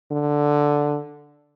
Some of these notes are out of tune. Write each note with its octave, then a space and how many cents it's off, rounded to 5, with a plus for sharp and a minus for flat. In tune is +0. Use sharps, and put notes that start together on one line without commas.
D3 +0